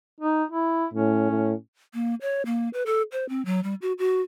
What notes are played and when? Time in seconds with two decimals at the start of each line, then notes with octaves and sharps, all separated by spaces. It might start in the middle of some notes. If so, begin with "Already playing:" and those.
0.20 D#4
0.51 E4
0.93 A2 C#4
1.31 A2
1.94 A#3
2.21 C#5
2.46 A#3
2.73 B4
2.86 A4
3.12 C5
3.29 C4
3.45 F#3
3.63 G3
3.82 F#4
3.98 F#4